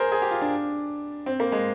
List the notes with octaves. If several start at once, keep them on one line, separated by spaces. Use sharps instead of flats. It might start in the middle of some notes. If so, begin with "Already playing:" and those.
Already playing: G#4 A#4 C5
G#4
G4
F4
D4
C4
A#3
G#3